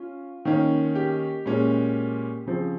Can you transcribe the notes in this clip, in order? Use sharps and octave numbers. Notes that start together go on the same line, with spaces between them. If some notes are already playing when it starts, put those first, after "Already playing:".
Already playing: C#4 F4
D#3 A#3 C#4
G4
A#2 G#3 C#4
C#3 F3 C4